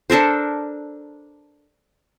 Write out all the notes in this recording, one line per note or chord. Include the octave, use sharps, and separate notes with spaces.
D4 A4 A#4 C5